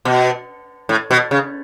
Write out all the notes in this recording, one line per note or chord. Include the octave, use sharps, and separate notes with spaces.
B2
A2
B2
C#3